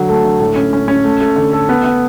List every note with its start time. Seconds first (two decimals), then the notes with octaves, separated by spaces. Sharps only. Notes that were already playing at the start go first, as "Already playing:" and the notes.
Already playing: D3 F#3
0.08 A3
0.25 D3
0.40 A2
0.56 C#4
0.73 C#4
0.88 C#4
1.04 A3
1.21 A3
1.36 D3
1.53 A4
1.69 B3
1.84 B3